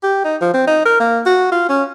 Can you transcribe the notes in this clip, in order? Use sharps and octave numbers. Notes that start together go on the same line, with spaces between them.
G4
D#4
F3
C4
D#4
A#4
A#3
F#4
F4
C#4